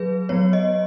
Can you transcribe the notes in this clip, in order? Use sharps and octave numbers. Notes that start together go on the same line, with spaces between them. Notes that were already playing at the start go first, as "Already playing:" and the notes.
Already playing: F#3 G#4 B4
F#3 B3 C#5
D#5